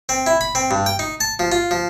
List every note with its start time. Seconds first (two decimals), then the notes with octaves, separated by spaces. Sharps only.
0.09 C4
0.27 E4
0.41 B5
0.55 C4
0.71 G2
0.86 G5
0.99 D#4
1.21 A5
1.39 F3
1.52 F4
1.71 F3